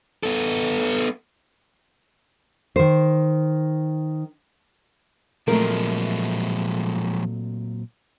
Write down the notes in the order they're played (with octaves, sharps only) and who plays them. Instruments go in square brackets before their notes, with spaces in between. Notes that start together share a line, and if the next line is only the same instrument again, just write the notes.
[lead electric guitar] B3 A4
[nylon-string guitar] D#3 C5
[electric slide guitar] A#2 F#3 C4 [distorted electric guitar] F3 G#3 [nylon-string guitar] A3 A#4